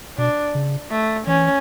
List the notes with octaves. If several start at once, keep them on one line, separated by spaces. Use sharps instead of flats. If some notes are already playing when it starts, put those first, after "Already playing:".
B2 D4
C#3
A3
E3 C#4